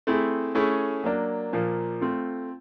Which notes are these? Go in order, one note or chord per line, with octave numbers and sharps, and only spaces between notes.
A3 C4 E4 G#4
A3 C#4 E4 G#4
F#3 A#3 D4
A#2 F3 A#3
A3 C4 F4